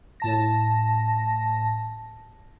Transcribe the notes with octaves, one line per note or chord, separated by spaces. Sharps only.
A2 A5 A#6